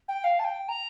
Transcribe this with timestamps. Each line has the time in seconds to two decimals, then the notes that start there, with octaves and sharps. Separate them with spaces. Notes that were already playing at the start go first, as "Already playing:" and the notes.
0.08 G5
0.24 F5
0.39 A5
0.44 G5
0.68 A#5